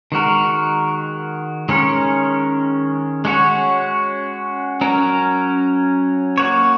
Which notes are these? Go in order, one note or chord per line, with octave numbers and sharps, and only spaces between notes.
D#3 G#3 F#4 A#4
D#3 G#3 C#4 A#4 C#5
G#3 C#4 F#4 C#5
F#3 C#4 A#4
A#3 F#4 C#5